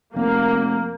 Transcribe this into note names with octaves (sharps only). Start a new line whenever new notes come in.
F1 A#3